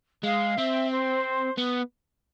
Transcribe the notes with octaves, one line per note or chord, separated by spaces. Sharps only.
G#3 F5
C4 E5
C5
B3